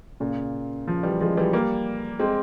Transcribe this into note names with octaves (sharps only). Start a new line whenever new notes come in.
A#2 C#3
C#3 F3
E3 G3
F3 G#3
E3 G3
G3 A#3
G#3 C4